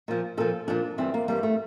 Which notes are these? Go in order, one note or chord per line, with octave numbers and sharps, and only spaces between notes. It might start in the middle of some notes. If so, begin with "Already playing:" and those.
A#2 F3
A#2 F3 A4
A#2 F3 D4
G2 E3 G3 C4
A#3
G2 E3 G3 A#3
A3